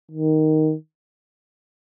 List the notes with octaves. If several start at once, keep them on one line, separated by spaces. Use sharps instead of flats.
D#3